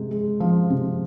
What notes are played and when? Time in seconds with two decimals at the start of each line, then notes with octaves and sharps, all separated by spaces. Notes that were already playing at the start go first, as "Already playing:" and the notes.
Already playing: C3 G#3
0.11 G#3
0.40 F3
0.70 C3